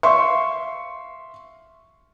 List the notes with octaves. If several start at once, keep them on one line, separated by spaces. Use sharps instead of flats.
E5 F5 C6 C#6